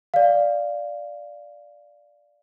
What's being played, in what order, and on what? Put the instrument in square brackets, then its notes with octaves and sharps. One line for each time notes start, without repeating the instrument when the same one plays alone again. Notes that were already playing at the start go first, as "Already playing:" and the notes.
[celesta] D5 F5